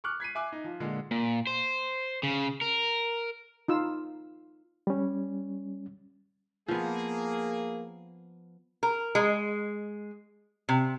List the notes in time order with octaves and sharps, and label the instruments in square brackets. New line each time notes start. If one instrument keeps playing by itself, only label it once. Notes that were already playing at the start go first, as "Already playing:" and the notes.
[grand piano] C#6 D6 F6 F#6
G#6 B6 C7 D#7
E5 G#5 D6 F#6
D#4
F3
A#2 D3 G#3
[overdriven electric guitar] A#2
C5
C#3
A#4
[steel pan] D#4 F4 E6
[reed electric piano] G3 C#4
[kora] F3 B3 [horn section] A#3 G#4
[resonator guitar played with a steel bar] A#4
G#3
C3